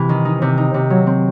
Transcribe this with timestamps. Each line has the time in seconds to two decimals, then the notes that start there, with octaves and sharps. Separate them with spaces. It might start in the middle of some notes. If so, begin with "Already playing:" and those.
Already playing: C3 E3
0.09 D#3
0.25 D#4
0.42 C3
0.58 D#4
0.74 C3
0.90 F#3
1.07 C4